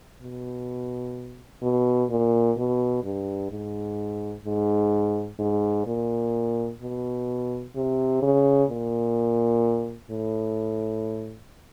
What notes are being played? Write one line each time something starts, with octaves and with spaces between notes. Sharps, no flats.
B2
B2
A#2
B2
G2
G#2
G#2
G#2
A#2
B2
C3
C#3
A#2
A2